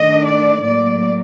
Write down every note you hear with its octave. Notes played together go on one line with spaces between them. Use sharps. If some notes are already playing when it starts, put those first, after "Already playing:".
Already playing: D#3 A3 D4 D#5
D5
A2 F#3 A#3 D5